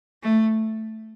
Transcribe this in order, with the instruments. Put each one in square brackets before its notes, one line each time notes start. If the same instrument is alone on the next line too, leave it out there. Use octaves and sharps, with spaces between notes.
[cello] A3